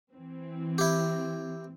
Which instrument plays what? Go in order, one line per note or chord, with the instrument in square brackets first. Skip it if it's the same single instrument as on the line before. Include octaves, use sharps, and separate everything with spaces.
[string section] E3 C4
[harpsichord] E4 G4